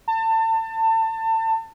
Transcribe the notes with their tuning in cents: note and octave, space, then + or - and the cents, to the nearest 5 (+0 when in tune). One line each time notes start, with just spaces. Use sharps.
A5 +30